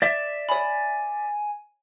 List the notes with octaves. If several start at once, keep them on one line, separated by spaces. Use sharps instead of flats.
D5 E5
C#5 G#5 B5